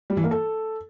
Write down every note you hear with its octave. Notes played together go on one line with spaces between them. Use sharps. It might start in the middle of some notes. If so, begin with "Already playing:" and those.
G3
E3
A#3
A4